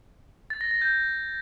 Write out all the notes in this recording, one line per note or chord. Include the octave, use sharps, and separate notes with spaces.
A6
A#6
A#6
G6